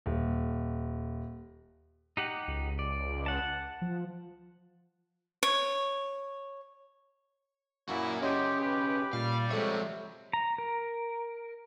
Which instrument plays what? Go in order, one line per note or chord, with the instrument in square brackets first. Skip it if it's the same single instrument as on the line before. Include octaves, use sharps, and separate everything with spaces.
[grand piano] D#1
[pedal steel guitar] D#4 G4 F#5
[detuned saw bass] C#2
[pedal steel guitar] D5
F#5 A5
[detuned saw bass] F3
[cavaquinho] C#5
[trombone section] A#2 E4 [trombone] A#3 [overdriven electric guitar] C#4 F#4
[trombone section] F#2 [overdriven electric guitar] C#3 [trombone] G4 [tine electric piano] C#5 D#5 C6
[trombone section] B1 B4 [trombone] G4
[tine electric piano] A#2 [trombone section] G3 [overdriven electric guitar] F5
[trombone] C3 [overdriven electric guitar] F3 C#5 [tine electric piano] G#3 A4 E5
[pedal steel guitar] A#5
A#4